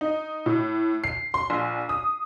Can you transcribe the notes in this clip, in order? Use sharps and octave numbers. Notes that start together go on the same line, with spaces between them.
D#4
A2
C7
C6
A#1
D#6